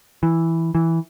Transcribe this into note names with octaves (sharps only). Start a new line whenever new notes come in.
E3
E3